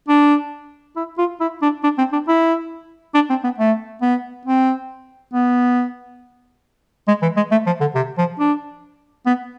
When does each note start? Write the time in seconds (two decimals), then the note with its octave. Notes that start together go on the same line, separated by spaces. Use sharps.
0.09 D4
0.96 E4
1.18 F4
1.40 E4
1.62 D4
1.84 D4
1.98 C4
2.13 D4
2.28 E4
3.14 D4
3.30 C4
3.44 B3
3.58 A3
4.02 B3
4.46 C4
5.34 B3
7.08 G#3
7.22 E3
7.37 G#3
7.51 A3
7.67 F3
7.80 D3
7.95 C3
8.18 F3
8.39 D4
9.26 B3